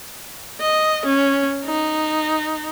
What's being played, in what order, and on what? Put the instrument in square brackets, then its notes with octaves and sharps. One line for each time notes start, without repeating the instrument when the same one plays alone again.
[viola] D#5
C#4
D#4